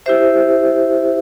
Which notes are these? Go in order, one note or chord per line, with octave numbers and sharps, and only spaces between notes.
E4 G4 C5 E5